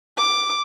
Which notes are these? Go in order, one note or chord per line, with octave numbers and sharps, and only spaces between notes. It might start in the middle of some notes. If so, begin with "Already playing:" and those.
D6